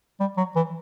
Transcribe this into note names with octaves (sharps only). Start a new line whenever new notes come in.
G3
F#3
E3